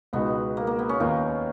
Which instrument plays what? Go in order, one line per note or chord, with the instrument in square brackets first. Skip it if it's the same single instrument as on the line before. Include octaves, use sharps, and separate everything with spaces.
[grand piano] C#2 B2 G#3 D#4 F#4 [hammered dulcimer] B3
[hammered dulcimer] A#3
A#3
B3
C#4
[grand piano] D#2 D#3 A#3 F4 A#4 [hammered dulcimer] D#4